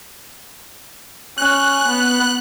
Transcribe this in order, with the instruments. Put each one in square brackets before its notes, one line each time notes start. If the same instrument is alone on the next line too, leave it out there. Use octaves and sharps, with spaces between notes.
[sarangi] C#4 [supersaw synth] F#6
[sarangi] B3